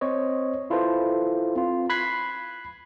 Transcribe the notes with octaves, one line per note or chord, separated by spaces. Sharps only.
C4 C5 C#5 D#5
E4 F4 A4 B4 C5
C4 F4
B5 F#6 G#6 B6 C7